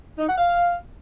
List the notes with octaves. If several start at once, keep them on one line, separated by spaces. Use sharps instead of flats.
D#4
F#5
F5